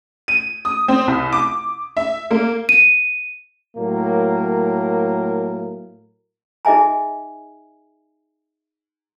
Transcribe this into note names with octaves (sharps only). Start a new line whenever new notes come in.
D#7
D#6
C4
C2
D6
E5
A#3
D#7
A2 F#3 A#3 A#4
D#4 G#4 D#5 E5 G#5 A#5